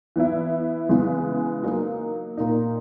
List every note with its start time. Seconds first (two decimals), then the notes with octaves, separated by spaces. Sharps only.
0.16 E3 B3 E4
0.89 C#3 E3 G#3 B3
1.63 F#3 A#3 D#4
2.37 A#2 A#3 D#4